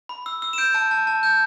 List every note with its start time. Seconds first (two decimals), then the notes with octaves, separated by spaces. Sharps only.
0.09 B5
0.26 E6
0.42 E6
0.53 E7
0.58 G6 D7
0.74 A5
0.91 A5
1.07 A5
1.23 G6